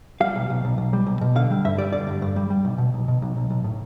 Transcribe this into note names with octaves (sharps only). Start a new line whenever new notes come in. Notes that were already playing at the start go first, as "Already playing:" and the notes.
G3 F5
B1
B1
B1
B1
G3
B1
B2
D3 F5
G3
G2 E5
G3 D5
D3 D5
G2
G2
G3
G3
B1
B2
B1
B2
B1
B1
B1
A2